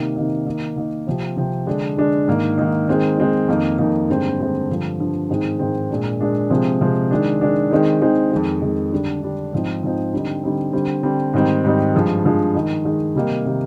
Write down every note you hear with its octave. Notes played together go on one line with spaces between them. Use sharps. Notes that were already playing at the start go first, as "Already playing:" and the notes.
Already playing: C3 D#3 A#3 D#4
C3 D#3 A#3 D#4
D#3 A#3 D#4
D#3 A#3 D#4
C3 F3 C4
C3 F3 C4
D3 G#3 D4
D3 G#3 D4
G#2 D#3 A#3 D#4
G#2 D#3 A#3 D#4
D#3 G#3 C4 D#4
D#3 G#3 C4 D#4
F2 D#3 A#3 D#4
F2 D#3 A#3 D#4
G2 D3 G#3 C4
G2 D3 G#3 C4
G2 D3 F3
G2 D3 F3
G#2 D#3 G#3 C4
G#2 D#3 G#3 C4
A#2 G#3 D4
A#2 G#3 D4
C3 F3 G#3 C4
C3 F3 G#3 C4
D#3 G#3 D4
D#3 G#3 D4
D#3 G#3 C4 D#4
D#3 G#3 C4 D#4
F2 D#3 G#3
F2 D#3 G#3
D3 G3 D4
D3 G3 D4
G#2 F3 C4 D#4
G#2 F3 C4 D#4
D3 G3 C4 D#4
D3 G3 C4 D#4
D3 G3 C4
D3 G3 C4
G#2 D#3 G3 C4 D#4
G#2 D#3 G3 C4 D#4
G2 F3 G#3
G2 F3 G#3
D#3 G#3 D#4
D#3 G#3 D#4
C3 D#3 G3 A#3 D#4
C3 D#3 G3 A#3 D#4